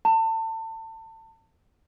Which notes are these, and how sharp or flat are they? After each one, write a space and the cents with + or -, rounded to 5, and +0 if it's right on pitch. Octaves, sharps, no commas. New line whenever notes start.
A5 +30